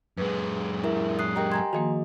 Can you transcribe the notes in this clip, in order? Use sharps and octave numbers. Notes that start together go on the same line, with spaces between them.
F#2 G#3 B4
E4 A#4 E5
D#6 F#6 C7
G4 A#4 D#5 G5 A#5
G#5 A#5 C6 G#6
D#3 F3 A#3 F#4 G#4 D#5